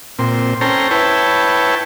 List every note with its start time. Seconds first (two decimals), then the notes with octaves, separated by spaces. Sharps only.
0.19 A#2 C4
0.61 C#4 A4 C5 G5 A#5
0.91 E4 B4 C#5 G5 A5